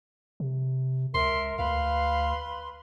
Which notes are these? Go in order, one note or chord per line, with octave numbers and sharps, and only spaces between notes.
C3
C#2 A#4 E5 C6
D2 B4 F5 B5 C6